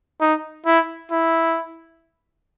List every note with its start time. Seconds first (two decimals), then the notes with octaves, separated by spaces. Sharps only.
0.21 D#4
0.66 E4
1.11 E4